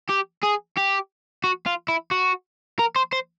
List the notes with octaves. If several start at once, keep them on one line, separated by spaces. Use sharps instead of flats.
G4
G#4
G4
F#4
F4
E4
F#4
A#4
C5
C5